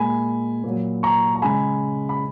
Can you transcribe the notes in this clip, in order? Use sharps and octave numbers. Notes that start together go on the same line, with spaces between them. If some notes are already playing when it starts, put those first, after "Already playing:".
Already playing: A#2 G#3 G#5 B5
A#2 F#3
A#5 C#6
A#5
C#3 G#3 G#5 B5
B5